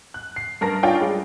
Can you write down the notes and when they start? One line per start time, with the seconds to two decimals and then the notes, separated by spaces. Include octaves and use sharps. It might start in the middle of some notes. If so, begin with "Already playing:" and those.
0.14 F#6
0.36 C7
0.61 G2 A#4 A5 A#6
0.83 D4 D#4 F4 C#5 G5 G#5
1.00 G3 G#3